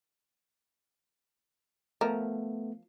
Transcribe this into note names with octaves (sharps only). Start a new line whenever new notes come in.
F3 A3 B3 A#4